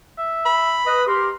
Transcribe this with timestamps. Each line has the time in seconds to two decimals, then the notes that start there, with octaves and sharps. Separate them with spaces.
0.18 E5
0.46 B5
0.86 B4 D#5 D#6
1.08 G4 A#4 C6